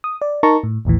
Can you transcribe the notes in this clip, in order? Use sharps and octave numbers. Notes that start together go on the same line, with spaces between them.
D#6
D5
D#4 A#4 A5 A#5 C#6
A2
A1 D#2 A2 E3